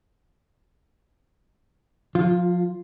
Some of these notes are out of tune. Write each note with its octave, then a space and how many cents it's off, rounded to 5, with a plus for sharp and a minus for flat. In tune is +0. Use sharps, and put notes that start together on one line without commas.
F3 +30 F4 +0